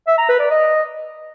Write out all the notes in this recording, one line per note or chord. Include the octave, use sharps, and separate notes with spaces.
E5
A#5
B4
D5
D#5